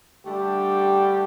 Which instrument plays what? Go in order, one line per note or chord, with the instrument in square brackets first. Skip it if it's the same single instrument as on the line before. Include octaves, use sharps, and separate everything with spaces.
[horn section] D3 G3 A3 D4 G4